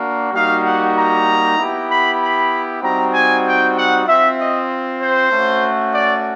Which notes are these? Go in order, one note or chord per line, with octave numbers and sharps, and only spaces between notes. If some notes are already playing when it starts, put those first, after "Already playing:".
Already playing: A#3 D4 F#4
G3 A#3 D#4 F#4 F5
F#5
A#5
B3 E4 G4
B5
B5
G3 C4 D#4 F#4 A#5
G#5
G5
F#5
C4 F4 E5
D#5
C5
A3 C#4 F#4
D5